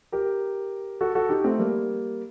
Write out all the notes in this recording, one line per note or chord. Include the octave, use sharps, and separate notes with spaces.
G4 A#4
F#4 A4
F#4 A4
D#4 G4
A3 C4
G3 A#3